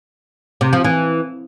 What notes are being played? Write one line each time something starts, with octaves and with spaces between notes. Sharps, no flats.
C3
F3
E3